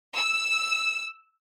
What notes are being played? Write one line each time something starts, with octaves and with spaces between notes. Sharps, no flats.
E6